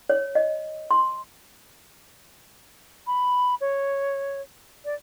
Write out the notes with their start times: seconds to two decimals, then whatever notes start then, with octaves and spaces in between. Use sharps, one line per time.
0.10 C#5
0.35 D#5
0.91 C6
3.07 B5
3.61 C#5
4.85 D5